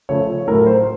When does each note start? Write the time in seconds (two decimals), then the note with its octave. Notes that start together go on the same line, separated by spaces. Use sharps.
0.09 C#3 F3 A3 C#5
0.47 A2 F#3 A3 A#4
0.67 C5